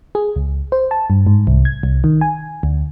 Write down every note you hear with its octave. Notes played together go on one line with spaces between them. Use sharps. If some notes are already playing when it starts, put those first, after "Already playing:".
G#4
C#2
C5
A5
G2
G#2
C2
G#6
C2
D#3
G#5
D2